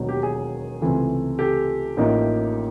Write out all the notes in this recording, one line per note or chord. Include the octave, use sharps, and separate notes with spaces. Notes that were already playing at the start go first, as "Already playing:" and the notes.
Already playing: E1 D#2 D#3 F#3 B3
G4
G#4
C#2 C3 E3 A3
G4 A4
A1 A2 F3 A#3 D#4